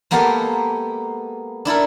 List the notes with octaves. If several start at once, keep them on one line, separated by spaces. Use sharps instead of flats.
G#3 A#3 B3 G4 A4 F5
D4 E4 A4 A#4